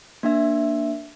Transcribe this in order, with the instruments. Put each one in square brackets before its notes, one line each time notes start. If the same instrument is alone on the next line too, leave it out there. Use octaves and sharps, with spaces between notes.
[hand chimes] A#3 D4 E5